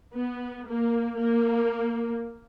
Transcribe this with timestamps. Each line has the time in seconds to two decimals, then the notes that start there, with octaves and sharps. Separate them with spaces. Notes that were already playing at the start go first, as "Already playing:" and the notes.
0.15 B3
0.67 A#3
1.19 A#3